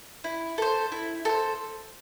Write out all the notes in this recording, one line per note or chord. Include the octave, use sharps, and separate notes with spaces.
E4
A4 C5
E4
A4 C5